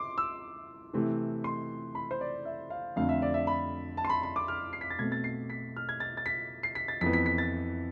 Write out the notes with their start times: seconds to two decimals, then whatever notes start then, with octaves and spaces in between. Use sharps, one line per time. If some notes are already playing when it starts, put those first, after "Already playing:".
Already playing: C6 D6
0.18 E6
0.94 C3 E3 A3 C4
1.44 C6
1.95 B5
2.11 C5
2.21 D5
2.45 E5
2.70 F5
2.96 F2 D3 A3 C4 F5
3.09 E5
3.22 D5
3.34 E5
3.47 B5
3.97 A5
4.05 C6
4.10 B5
4.23 B5
4.36 D6
4.48 F6
4.73 C7
4.81 B6
4.90 A6
4.99 B2 A3 C4 G#6
5.12 A6
5.24 C7
5.50 B6
5.76 F6
5.89 G#6
6.00 A6
6.17 A6
6.26 B6
6.63 C7
6.75 B6
6.88 A6
7.01 F2 E3 B3 B6
7.13 B6
7.26 B6
7.38 A6